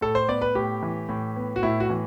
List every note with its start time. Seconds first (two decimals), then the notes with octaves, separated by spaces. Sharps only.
0.01 A2 A4
0.15 C5
0.29 B3 D5
0.42 B4
0.55 A2 G4
0.82 E3
1.09 A2
1.36 B3
1.56 F#4
1.63 A2 E4
1.80 F#4
1.90 E3